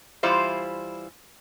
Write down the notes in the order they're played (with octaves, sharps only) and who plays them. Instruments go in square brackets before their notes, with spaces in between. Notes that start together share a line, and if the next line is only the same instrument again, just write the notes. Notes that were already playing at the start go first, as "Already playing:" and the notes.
[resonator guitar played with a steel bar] E3 G3 E4 F4 C5